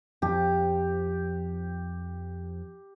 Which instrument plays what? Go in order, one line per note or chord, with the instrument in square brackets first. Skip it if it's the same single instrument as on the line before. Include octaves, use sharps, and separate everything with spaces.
[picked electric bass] F2 F3 [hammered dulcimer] G4